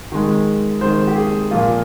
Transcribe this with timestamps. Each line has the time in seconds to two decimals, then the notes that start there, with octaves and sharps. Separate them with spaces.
0.12 D#3 G#3
0.81 D#3 G#3 C5
1.08 G4
1.16 G#4
1.51 A#2 F3 A#3 F4